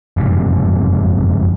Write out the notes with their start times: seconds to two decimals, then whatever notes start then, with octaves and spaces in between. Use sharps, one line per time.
0.17 F#1 F2 G#2 C3